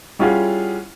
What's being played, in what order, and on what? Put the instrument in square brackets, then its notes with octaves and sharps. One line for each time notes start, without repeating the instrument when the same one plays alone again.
[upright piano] G3 C#4 E4 F4 G#4 F#5